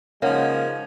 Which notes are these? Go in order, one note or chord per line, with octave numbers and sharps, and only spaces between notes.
C#3 F3 G#3 A#3 C#4 D#4 C#5 F#5